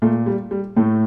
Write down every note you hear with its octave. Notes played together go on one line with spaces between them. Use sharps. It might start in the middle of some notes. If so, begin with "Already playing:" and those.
A#2 A3
G3
G3
A2 A3